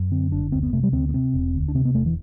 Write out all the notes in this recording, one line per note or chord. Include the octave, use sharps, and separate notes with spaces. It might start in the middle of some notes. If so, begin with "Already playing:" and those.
Already playing: F#2
D3 C4
F#1 D4
D2 C4
B3
C3 A3
G3
D2 C4
B3
C3 C4
E1
D2
D4
C3 C4
B3
E1 A3
E3